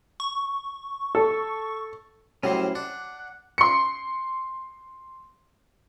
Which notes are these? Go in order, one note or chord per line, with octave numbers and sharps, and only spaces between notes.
C#6
A4
A2 F#3 G3 C#4 E4 C5
D4 F#5
C6 C#7